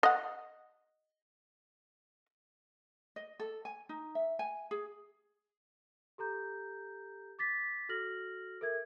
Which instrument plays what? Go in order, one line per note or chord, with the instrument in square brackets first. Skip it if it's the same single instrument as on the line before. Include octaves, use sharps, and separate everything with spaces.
[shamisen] D#5 F#5
[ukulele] D#5
A4
G#5
D#4
E5
G#5
G#4
[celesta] G4 A4 A#5 G6
D6 A6 B6
F#4 A4 F6 A#6 F#7
A4 A#4 E5 G#6